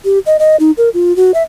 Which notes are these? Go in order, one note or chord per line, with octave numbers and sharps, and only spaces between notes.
G4
D#5
D#5
D#4
A#4
F4
F#4
E5